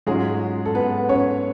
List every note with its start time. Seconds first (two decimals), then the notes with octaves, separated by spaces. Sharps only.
0.07 G#2 F#3 G#3 C#4 F4 G#4
0.66 A4
0.75 B3 B4
1.09 C#4 C#5